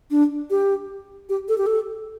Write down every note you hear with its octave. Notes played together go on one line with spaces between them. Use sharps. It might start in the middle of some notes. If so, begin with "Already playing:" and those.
D4
G4
G4
A4
G4
A4